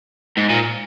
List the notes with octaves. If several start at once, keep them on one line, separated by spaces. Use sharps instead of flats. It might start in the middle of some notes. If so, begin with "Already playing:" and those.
G#2
A#2